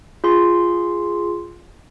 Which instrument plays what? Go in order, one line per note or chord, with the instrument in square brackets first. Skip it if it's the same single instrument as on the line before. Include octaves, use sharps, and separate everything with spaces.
[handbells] F4 G#4 C6